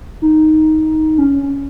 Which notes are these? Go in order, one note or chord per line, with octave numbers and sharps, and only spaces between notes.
D#4
C#4
C#4